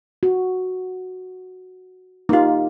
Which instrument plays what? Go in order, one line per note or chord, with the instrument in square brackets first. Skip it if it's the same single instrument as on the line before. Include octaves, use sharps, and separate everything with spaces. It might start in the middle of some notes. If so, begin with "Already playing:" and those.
[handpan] F#4
[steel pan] A#3 F4 [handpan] D#4 G4